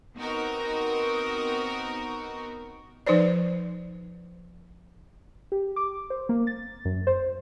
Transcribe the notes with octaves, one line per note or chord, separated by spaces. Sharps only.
B3 C4 D#4 F#4 A#4
F3 D#4 B4 C5 D5
G4
D6
C5
A#3
A6
F#2
C5